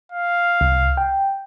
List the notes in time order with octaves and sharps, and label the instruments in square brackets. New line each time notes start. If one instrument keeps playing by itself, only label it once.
[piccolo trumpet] F5
[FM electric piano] C2
G5